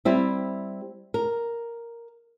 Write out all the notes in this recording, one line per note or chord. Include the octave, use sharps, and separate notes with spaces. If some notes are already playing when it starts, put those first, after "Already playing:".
G3 C4 E4
A#4